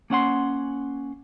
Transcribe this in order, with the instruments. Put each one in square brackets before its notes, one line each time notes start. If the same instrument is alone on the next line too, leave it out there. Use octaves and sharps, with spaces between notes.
[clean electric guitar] A#3 C#4 F#5 C6